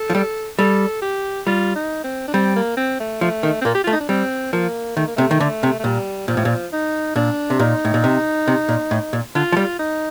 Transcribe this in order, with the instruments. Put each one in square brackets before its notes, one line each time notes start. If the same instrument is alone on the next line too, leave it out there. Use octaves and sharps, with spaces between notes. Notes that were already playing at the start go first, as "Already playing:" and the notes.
Already playing: [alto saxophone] A4
[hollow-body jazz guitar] F3
G3
[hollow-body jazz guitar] G3 [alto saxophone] A4
[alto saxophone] G4
[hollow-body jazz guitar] G3 [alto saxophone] F4
[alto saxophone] D#4
C4
D4
[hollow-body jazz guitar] G3 [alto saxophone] C4
[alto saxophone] A#3
C4
A3
[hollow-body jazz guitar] F3 [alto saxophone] A3
[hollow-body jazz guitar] D#3
[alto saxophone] C4
[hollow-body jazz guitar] A#2 [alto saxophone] A#3
[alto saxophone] G4
[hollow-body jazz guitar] A3 [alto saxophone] F4
[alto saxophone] D#4
D4
[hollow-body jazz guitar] G3 [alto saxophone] C4
[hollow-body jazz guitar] F3 [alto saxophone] A#3
[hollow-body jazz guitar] D#3 [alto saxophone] A3
[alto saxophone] A#3
[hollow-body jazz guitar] C3 [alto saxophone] A3
[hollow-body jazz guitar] D#3
D3
C3
[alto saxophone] A3
[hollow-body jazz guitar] A#2 [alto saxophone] G3
[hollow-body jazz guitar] A#2 [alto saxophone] F3
[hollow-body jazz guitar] A2
A#2
[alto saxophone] D#4
[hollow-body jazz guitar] A#2 [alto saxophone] D4
[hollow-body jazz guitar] C3
[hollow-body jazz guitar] A#2 [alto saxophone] D#4
[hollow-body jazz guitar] A2
A#2
C3
C3
A#2
A2
A#2
[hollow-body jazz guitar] D3 [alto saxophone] F4
[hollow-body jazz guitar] F3
G3
[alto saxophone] D#4